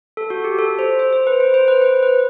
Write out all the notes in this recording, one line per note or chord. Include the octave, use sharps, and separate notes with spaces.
A4
F#4
G4
A4
C5
C5
C5
B4
C5
C5
B4
C5
B4